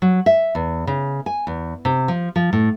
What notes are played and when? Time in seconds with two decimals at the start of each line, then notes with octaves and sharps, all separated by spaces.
0.02 F#3
0.26 E5
0.55 E2
0.87 C#3
1.26 G#5
1.47 E2
1.85 C3
2.08 F3
2.36 F3
2.53 A2